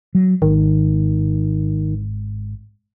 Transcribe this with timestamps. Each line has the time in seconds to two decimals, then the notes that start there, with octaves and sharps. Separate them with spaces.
0.15 F#3
0.42 G#1 D#3